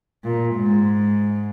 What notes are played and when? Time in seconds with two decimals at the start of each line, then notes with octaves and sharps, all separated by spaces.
0.24 A#2
0.56 G#2